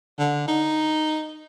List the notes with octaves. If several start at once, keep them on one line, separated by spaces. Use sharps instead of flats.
D3
D#4